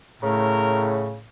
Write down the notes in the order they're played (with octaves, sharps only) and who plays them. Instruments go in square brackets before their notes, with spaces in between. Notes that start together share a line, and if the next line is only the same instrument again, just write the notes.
[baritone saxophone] A2 [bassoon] C#3 [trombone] A#4